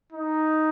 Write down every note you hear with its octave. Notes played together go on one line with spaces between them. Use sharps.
D#4